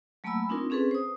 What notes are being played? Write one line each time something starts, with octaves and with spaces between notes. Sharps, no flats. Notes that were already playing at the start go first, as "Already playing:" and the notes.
F#3 A3 A#3 G#5 B5 E6
C4 D4 D#4 F4 A#4
C4 C#4 G#4 A4 B4
C5 D#6